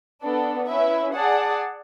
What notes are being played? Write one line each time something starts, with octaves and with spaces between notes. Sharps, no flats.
B3 D4 A4
C#4 E4 B4 E5
G#4 D5 F#5 A5